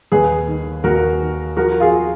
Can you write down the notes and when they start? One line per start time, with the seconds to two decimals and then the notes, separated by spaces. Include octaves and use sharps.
0.12 D#2 G#4 B4
0.48 D#3
0.84 D#2 F#4 A#4
1.21 D#3
1.57 F3 F#4 A#4
1.80 F4 G#4